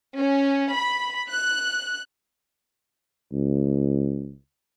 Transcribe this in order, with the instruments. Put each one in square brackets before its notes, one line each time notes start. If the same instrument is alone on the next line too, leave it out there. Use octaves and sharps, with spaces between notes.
[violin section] C#4
B5
F#6
[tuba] C#2